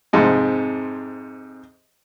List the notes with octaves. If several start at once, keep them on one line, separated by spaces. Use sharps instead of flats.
F2 G#2 C3